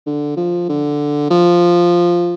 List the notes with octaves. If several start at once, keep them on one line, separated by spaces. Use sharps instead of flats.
D3
F3
D3
F3